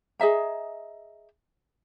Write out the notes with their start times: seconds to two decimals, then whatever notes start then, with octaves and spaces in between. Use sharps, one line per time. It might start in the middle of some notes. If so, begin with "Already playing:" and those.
0.20 G#4 D#5 E5 A#5